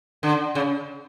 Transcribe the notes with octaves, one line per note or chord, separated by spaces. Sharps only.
D3
C#3